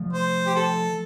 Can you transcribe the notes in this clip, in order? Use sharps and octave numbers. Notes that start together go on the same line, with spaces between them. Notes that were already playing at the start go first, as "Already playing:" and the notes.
Already playing: F3 A3
C5
G4
A4